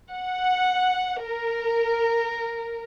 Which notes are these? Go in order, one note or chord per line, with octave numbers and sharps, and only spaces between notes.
F#5
A#4